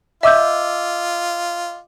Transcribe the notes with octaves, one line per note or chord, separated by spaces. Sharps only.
F4 D#5 E5 D6 E6 G6